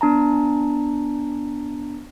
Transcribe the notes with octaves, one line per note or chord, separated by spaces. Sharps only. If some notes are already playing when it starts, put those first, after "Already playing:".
B3 D4 A5 A#5